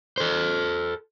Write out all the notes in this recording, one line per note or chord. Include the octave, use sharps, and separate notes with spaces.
A4 C5